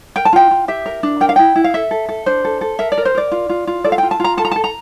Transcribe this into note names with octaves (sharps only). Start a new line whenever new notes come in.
A#4 G5
A5
F4 G5
F4
G4 E5
A#4
D4
A#4 G5
F5
E4 G5
E4
F5
A4 E5
A4
A4
D4 C5
A4
A4
A#4 E5
D5
A#4
C5
A#4 D5
F4
F4
F4
A4 D5
F5
F4 G5
A5
F4 A#5
A4 A5
A#5
A4 A5
A#5